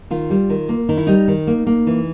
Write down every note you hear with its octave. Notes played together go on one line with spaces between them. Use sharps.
D#3 F4
G3
D#3
A#3
D#3 D#4
E4
G3 D#4
D#3
A#3
A#3
E3